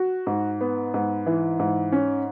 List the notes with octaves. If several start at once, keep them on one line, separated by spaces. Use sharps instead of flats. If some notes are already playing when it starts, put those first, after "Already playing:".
Already playing: F#4
G#2
B3
G#2
E3
G#2
C#4